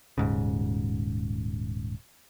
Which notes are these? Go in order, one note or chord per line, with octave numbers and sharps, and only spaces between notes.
D#1 G#2 C#3